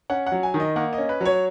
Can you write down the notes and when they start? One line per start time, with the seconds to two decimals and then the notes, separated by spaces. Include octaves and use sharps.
0.10 C#4 F#5
0.26 F#5
0.32 F#3
0.43 G#5
0.54 D#3
0.60 D#5
0.76 A#3 F#5
0.93 D#5
0.98 C#4
1.09 B4
1.21 F#3 C#5